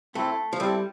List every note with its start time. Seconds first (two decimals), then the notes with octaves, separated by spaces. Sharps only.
0.15 A3 C4 E4 A4
0.53 F3
0.59 G3 C4 E4 A4